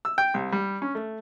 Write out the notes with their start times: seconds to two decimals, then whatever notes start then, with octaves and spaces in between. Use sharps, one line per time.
0.05 E6
0.18 G5
0.34 C2
0.52 G3
0.82 C#4
0.95 A3